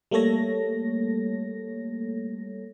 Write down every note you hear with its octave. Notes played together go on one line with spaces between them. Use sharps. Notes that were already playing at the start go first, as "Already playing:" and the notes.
G3 A3 A#3 A4 C#5 A#6